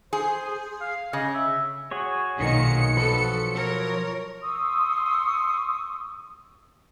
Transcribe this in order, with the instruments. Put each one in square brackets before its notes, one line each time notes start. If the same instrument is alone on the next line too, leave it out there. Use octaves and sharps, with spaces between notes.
[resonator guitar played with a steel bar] G#4 [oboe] C5
[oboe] F5
[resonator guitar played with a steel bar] C#3 [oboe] D#5
[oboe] E5
[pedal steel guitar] F#4 G#4 C#5
[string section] B1 C#7 [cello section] A#2 D#3
[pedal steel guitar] F3 F#3 B4 [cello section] A4
[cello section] A#4 C#5
[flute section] C6 C#6 D#6 E6